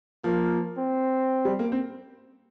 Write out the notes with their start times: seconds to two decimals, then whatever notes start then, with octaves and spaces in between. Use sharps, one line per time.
0.24 F3 A#3
0.78 C4
1.45 G3
1.59 A#3
1.72 C4